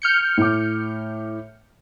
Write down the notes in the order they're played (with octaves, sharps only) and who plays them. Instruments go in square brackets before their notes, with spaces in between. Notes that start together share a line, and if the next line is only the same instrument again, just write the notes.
[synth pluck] F6 G6 C#7
[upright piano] A2 D6